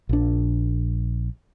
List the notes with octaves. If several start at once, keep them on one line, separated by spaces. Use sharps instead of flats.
A#1 D4